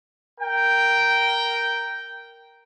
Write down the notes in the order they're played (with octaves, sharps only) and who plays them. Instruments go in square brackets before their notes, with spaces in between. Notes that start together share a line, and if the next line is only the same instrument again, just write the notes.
[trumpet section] A#4 G5